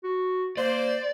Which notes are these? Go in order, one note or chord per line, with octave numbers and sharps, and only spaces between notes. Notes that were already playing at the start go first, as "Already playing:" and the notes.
F#4
A#3 C5 D5